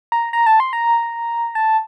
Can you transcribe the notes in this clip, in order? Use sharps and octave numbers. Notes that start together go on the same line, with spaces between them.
A#5
A#5
A5
C6
A#5
A5